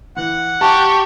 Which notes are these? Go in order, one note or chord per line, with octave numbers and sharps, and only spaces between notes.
E3 F#5
G4 A5 C#6